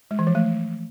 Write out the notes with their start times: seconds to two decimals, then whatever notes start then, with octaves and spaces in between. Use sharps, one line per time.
0.11 G#3
0.19 E3
0.27 F3
0.35 A3